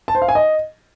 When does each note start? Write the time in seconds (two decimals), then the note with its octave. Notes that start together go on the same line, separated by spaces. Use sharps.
0.08 A5
0.15 C5
0.22 F5
0.28 G#5
0.35 D#5